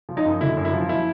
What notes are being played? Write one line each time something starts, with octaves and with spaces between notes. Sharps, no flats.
F3
D#4
F#2
D3 E4
F#2
E4
F3
E4